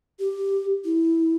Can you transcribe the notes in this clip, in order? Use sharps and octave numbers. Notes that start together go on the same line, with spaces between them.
G4
E4